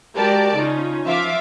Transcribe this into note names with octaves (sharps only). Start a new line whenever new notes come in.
G#3 F#4 G4 A#4 D5 A5
C#3 C#4 D#4 F4
F3 F4 E5 F5 D6